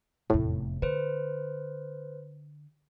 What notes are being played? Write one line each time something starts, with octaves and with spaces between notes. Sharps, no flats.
F1 E2 A2
D3 B4 C5